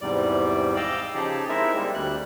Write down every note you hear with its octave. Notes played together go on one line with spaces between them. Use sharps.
E2 G#2 C3 G3 D5
D#5 F5 G5 D6 E6
C#3 F3 D#4 G4 G#4 A5
G#3 C4 D#4 E4 A#4 E5
G3 G#3 A#3 C4
D2 G3 F#6